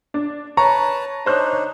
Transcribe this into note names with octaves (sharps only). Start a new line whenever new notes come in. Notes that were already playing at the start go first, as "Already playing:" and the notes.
D4
B4 C#5 A5 A#5 C#6
D4 D#4 C5 C#5 F#6